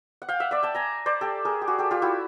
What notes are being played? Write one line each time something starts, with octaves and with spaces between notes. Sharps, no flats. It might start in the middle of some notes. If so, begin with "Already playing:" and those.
F#5
F5 G5
E5 F#5
D5 E5
G5 A5
G#5 A#5
C5 D5
G4 A4
G#4 A#4
G4
F#4 G#4
G4 A4
F4 G4
E4 F#4